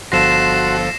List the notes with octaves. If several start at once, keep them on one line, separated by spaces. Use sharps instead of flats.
G1 F3 F#4 A4 C6 A#6 C7 E7